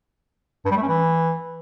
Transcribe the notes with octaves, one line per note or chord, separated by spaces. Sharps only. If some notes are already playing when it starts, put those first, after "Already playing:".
G2
G3
A3
C#4
E3